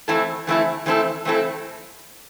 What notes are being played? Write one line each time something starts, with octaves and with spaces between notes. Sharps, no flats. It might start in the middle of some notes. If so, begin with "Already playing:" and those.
E3 A3 C4 E4 A4
E3 A3 C4 E4 A4
E3 A3 C4 E4 A4
E3 A3 C4 E4 A4